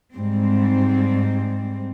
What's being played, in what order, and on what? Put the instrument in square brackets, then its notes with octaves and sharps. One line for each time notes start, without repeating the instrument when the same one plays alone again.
[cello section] G#2 G3 C4